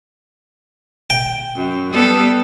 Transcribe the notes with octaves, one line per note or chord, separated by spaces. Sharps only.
G5
F#2
G3 B3 A4